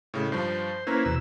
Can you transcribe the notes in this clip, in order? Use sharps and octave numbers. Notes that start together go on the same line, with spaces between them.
A2 C#3 G#3
G2 F3 C5
A#3 C#4 E4 B4 C5 A#5
E2 B2 E6